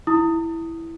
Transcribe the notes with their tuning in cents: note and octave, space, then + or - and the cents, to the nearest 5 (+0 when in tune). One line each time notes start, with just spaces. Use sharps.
E4 +0 D#6 +0